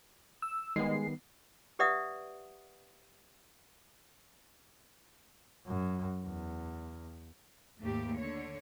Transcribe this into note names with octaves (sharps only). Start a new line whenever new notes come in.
E6
D#3 G3 G#3 B3 C7
G4 B4 D5 E5 F#5 D#6
F#2
E2
D#2 G#2 A3 A#3 G4
D3 C#5